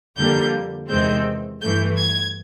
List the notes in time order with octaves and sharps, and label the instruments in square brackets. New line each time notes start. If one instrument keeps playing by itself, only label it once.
[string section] F2 D3 G3 A#3 G6
E2 C3 D#3 G#3 C4 G6
G2 E3 A3 G6
G#6